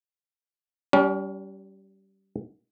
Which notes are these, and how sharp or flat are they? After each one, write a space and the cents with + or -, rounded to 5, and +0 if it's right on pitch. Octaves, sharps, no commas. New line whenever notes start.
G3 -20 C#4 +35